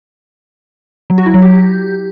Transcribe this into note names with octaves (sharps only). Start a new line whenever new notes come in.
F#3
F#4
E4
F#3
G4